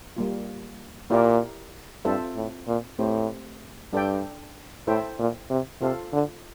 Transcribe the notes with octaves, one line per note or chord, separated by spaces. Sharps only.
G3 A#3 F4
A#2 E4 G4 A#4 D5
G2 C4 F4 A4 C5 E5
A2
A#2
A2 A3 C4 G4 C5
G2 D4 A4 D5 G5
A2 E4 A4 C5 E5 G5
A#2
C3
C3 F4 A4 C5 F5
D3